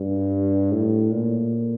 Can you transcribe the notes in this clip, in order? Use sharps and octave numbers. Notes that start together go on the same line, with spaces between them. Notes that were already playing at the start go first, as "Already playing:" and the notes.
Already playing: G2
A2
A#2